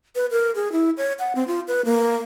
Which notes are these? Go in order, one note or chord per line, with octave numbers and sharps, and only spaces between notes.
B4
A#4
G#4
E4
C#5
F#5
C4
F4
B4
A#3